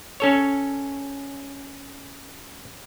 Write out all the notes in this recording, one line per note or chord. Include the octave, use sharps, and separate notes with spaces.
C#4 A4 C#5